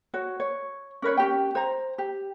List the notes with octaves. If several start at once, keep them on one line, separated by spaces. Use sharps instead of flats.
F#4 C#5
C#5
C#4 A#4 B4 C#5
C#4 G4 G5
C5 A#5
G4